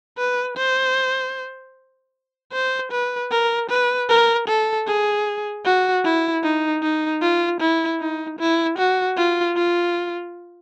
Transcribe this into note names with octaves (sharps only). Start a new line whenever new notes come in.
B4
C5
C5
B4
A#4
B4
A#4
A4
G#4
F#4
E4
D#4
D#4
F4
E4
D#4
E4
F#4
F4
F4